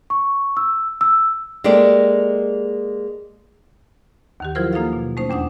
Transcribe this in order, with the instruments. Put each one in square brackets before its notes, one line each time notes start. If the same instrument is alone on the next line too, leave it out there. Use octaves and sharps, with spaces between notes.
[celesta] C#6
E6
E6
[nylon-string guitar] G#3 A#3 G4 A4 D5
[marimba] D#2 D#3 G4
F3 F#3 E4 F4 A#4 C5
F#3 A#3 D#4 F4 A4 F5
B2
A3 C#4 D#4 C5
E2 D4 F#5 D#6